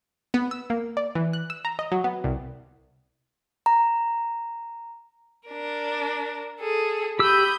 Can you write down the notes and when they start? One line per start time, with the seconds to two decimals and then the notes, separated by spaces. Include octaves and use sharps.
0.34 B3
0.51 E6
0.70 A#3
0.97 D5
1.15 E3
1.33 F#6
1.50 E6
1.65 A#5
1.79 D#5
1.92 F#3
2.04 B3
2.24 C2
3.66 A#5
5.49 D4 A#4
6.59 G#4 A4
7.19 G4 B5 D#6 E6 G6